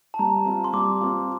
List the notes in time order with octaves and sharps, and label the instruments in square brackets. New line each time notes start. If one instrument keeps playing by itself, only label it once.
[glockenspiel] A5
[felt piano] G3 [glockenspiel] A#5
[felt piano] C4 F4
[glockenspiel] C6
[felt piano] G3 [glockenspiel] D6
[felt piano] C4 F4